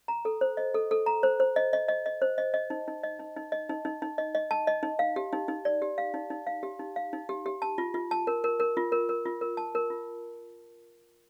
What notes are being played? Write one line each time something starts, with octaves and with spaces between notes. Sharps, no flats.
A#5
A4
C5
D#5
A4
A4
A#5
C5
C5
D#5
D#5
D#5
D#5
C5
D#5
D#5
D#4
D#4
D#5
D#4
D#4
D#5
D#4
D#4
D#4
D#5
D#5
A5
D#5
D#4
F5
G4
D#4
D#4
D5
G4
F5
D#4
D#4
F5
G4
D#4
F5
D#4
G4
G4
A5
F4
F4
A5
A#4
A#4
A#4
F4
A#4
A#4
F4
A#4
A5
A#4
F4